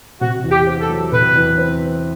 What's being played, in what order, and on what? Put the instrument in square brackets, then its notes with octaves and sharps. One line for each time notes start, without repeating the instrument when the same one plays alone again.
[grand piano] C3 [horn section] F#4
[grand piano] E2
[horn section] G4
[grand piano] C4
[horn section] A4
[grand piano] F#3
[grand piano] C3 [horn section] B4
[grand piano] E2
C4